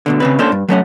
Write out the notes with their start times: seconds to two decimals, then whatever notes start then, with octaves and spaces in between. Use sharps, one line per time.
0.06 D2 B2 D3
0.20 C#3 C4 B4
0.39 A#3 C#4 D4 A4 C5
0.52 G2
0.68 F#3 A3 C#4 F#5